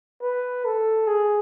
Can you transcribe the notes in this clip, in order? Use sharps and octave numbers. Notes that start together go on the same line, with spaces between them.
B4
A4
G#4